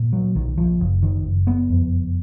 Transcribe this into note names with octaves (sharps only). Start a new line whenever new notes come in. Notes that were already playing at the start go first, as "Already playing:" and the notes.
Already playing: A#2
F#3
B1 D#3
F3
F#1
D#3
F#1
B3
F2